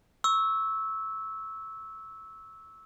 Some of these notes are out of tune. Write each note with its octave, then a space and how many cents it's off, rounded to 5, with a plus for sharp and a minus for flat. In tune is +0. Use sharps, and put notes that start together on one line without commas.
C#6 +0 E6 -15